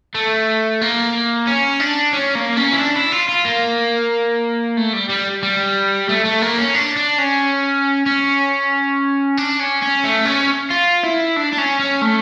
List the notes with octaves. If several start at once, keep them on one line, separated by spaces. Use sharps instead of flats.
A3
A#3
C#4
D4
C#4
A#3
C#4
E4
D4
E4
F4
F4
A#3
A3
G3
G3
G3
A3
A3
A#3
C#4
D4
D4
C#4
C#4
D4
C#4
C#4
A3
C#4
F4
E4
D4
D4
C#4
C#4
A3